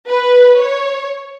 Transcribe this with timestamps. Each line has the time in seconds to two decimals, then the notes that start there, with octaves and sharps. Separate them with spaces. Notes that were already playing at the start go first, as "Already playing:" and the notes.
0.09 B4
0.60 C#5